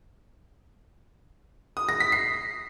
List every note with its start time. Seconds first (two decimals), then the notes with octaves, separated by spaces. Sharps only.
1.77 D#6
1.89 A#6
2.00 B6
2.12 C7